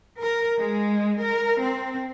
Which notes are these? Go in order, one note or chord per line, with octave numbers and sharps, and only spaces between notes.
A#4
G#3
A#4
C4